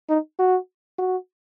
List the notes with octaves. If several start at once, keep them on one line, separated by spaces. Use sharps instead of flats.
D#4
F#4
F#4